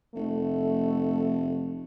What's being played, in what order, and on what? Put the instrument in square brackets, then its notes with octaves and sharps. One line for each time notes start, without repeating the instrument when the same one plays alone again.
[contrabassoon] F1 [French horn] A3